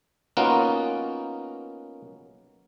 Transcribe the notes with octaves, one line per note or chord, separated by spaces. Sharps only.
A#3 B3 C#4 D#4 F4 F#4